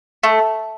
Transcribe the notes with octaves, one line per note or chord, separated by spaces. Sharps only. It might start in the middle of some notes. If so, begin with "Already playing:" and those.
A3